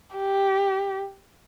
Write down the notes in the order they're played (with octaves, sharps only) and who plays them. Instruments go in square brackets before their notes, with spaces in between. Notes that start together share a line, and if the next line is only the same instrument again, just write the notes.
[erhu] G4